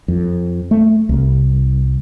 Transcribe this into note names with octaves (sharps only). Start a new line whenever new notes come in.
F2
A3
C2